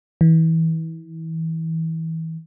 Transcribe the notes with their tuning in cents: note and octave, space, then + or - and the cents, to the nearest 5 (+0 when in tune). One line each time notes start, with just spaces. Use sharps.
E3 -30